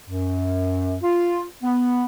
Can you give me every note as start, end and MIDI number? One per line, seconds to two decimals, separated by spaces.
0.09 0.96 42
1.03 1.44 65
1.62 2.05 59